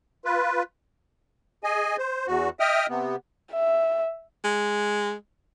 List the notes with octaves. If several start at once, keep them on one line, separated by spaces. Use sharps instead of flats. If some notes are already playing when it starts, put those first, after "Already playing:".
F4 B4
G#4 D#5 G#5
C5
E2 F#4
D#5 E5 G5 D#6 F6
C3 B3
E5
G#3